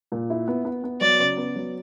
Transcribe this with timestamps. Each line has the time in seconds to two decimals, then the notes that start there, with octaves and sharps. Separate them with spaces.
0.12 A#2
0.30 E4
0.48 B3
0.65 B3
0.84 B3
1.01 F#3 D5
1.19 C#3
1.37 B3
1.56 F#3